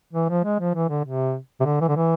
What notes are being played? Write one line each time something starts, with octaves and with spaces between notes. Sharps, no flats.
E3
F3
G#3
F3
E3
D3
C3
C3
D3
E3
D3
E3